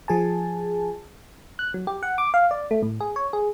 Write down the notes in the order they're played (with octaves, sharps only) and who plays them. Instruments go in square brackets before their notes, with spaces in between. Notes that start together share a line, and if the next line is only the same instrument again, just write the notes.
[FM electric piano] F3 G#4 G#5 A5
[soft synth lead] F#6
F#3
G4
F#5
D6
F5
D5
A3
A2
G#4
C#5
G#4